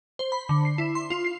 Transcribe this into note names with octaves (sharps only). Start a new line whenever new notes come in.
C5
B5
D3
C7
E4
C6
F4
C7